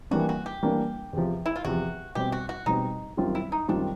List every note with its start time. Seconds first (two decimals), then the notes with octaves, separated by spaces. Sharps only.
0.11 E3 G3 A#3 D4 F#4
0.29 F#4
0.46 G4
0.63 E3 G3 A#3 D4
1.13 E2 C3 F3
1.46 E4
1.56 F4
1.64 E2 C3 F3 F#4
2.15 B2 G3 C4 G4
2.32 F#4
2.49 F#4
2.66 B2 G3 C4 D#4
3.17 F#2 D#3 G3 C4 F4
3.35 E4
3.52 D#4
3.68 F#2 D#3 G3 C4 D4 F4